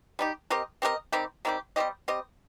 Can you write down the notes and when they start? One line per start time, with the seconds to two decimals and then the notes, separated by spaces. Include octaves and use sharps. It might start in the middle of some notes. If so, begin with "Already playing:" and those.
0.19 G3 D#4 G4
0.50 C4 G4 A#4 D#5
0.82 C4 G4 A#4 D#5
1.12 D#3 G3 C4 G4
1.45 D#3 G3 C4 G4
1.76 G3 C4 G4 D#5
2.08 G3 C4 G4 D#5